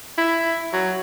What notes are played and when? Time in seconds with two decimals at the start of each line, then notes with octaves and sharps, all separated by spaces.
0.18 E4
0.73 F#3